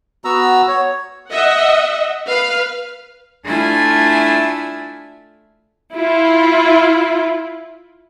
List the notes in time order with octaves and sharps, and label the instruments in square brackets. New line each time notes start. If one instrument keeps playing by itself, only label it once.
[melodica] B3 F#4 A#5 E6
C#5
[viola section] D#5 E5 F#5
B4 F5
[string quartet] A3 D4 E4 F4 E5 G#5
[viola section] E4 F4